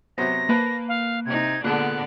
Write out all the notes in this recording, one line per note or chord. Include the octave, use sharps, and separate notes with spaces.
C3 F#3 B3 C5 A#6
A#3 B4 A5
F5
C3 D#4 G#6
A#2 D3 G#3 A#3 B3 D4 F#6